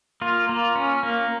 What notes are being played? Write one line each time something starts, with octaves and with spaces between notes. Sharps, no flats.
A#3 F4
A#3
C#4
A#3